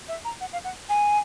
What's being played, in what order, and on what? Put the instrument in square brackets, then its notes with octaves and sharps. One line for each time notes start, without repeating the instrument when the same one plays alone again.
[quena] E5
A#5
F#5
F5
F#5
G#5